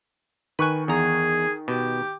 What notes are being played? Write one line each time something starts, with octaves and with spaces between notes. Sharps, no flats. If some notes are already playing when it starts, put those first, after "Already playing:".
D#3 B4 G#5 C#6 F#6
E2 G#4 A#5
B2 G4